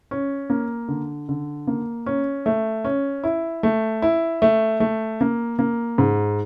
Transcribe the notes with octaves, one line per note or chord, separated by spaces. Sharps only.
C#4
A#3
D3
D3
A#3
C#4
A3
C#4
E4
A3
E4
A3
A3
A#3
A#3
G#2